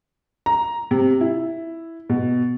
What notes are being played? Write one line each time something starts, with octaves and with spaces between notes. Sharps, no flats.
A#5
C3
E4
B2